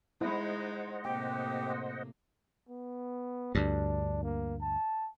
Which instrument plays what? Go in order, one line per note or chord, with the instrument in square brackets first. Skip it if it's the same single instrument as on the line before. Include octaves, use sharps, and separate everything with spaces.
[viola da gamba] G#3 D#4 [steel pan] E4 [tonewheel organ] C5 D#5 F#5
[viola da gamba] A2 C3 A#3 [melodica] G4 [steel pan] G5
[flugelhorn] B3
[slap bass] D2 G2 [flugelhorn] D4
[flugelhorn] A#3
A5